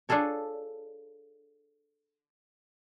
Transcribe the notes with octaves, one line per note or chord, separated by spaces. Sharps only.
D4 F4 G#4 A4 C#5